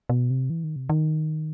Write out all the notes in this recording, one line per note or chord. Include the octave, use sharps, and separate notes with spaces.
B2
C3
E3
D#3
C3
D#3